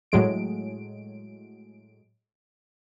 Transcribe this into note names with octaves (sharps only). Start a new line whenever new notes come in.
A2 F#3 G#3 D7